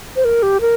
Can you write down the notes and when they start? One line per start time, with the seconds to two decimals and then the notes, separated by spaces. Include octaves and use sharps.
0.16 C5
0.25 A#4
0.43 G4
0.61 A#4